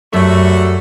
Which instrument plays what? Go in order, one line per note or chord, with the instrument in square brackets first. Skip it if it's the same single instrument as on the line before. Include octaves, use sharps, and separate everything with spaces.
[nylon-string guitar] F#2 [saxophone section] F#3 G3 A3